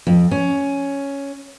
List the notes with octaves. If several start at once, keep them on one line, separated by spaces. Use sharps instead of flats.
F2
C#4